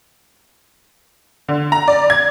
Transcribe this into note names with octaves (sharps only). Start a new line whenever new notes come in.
D3
A#5
D5
G#6